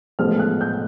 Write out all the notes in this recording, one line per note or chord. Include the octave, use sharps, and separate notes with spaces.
A1 A2 F3 G#3 B3 F6
F#6
G6